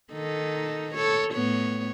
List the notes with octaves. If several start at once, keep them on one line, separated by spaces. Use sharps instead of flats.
D#3 D#4 A4
A4 C#5
A2 B3 C#5